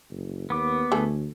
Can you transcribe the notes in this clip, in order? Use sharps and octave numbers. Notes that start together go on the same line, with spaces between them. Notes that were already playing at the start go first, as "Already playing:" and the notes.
F#1
D#2 B3 D6
D2 A3 G#4 A4